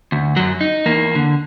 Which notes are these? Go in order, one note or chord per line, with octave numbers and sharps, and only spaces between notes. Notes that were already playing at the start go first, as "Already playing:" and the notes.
D2
F#2 F#3
D#4
E2 A#3
D3